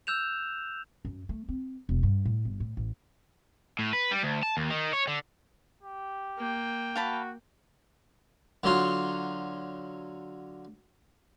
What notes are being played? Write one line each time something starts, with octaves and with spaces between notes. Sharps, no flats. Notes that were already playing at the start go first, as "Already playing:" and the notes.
E6 F#6 G6 E7 F7
F#2
A3
C4
E1
G2
A2
G1
A2
A1
A2
B4
G3
D2
A5
D#2
D#3
C#5
D3
G4
A#3 G5
F#4 F5 A5 B5
D3 F#3 F4